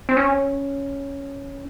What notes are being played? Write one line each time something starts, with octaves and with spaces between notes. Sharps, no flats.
C4
C#4